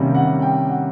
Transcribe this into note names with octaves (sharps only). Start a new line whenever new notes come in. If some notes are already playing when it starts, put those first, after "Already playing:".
Already playing: C3 D#3 G3 A#3 C#4
F#5
G5
F#5